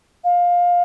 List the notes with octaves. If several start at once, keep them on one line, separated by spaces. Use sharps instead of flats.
F5